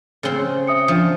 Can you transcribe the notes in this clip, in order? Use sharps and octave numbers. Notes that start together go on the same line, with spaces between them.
C#3 C4
E5 D#6 C#7
F3 D4